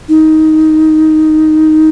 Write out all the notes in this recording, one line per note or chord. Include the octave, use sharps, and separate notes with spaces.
D#4